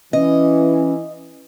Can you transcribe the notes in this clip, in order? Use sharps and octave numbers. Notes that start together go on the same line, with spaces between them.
E3 C#4 D#5